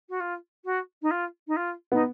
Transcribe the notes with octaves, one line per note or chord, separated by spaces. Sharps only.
F#4
F4
F#4
D#4
F4
D#4
F4
B3 D#4